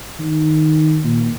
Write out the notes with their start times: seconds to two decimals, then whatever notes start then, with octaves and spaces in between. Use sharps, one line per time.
0.19 D#3
1.04 A#2